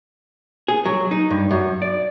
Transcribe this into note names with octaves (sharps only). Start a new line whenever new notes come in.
G#4
F#3
D#4
G2
F#2
D5